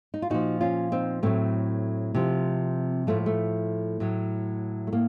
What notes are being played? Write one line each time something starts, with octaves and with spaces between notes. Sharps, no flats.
D#4
F4
A#2 F3 D#4 F#4
C#4 F4
C4 D#4
A2 F#3 A3 C4
C3 F3
A2 F3 A3
A3
A2 F#3
A3
A2 A#3